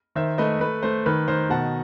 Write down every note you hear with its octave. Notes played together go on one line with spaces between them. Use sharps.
D#3 C5 E5
A3 B4 D#5
A3 B4
A3 C5
D#3 B4
D#3 C5
B2 F#5 A5